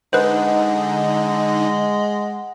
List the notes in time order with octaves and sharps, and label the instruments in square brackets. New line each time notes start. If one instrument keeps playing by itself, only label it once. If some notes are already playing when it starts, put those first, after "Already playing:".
[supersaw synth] D3 D#4 [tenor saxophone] G#3 [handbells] B4 C5 [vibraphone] F#5